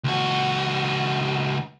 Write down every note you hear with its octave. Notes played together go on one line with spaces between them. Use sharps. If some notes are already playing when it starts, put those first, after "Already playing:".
C#2 F#4